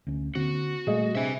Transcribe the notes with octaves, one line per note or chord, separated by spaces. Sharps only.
D2 C#4
D3 A#3 C4 F#4
A#2 G3 A3 G#4 D#5
C3 D4 E5 G#5